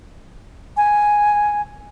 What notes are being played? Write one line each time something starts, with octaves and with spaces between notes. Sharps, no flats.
G#5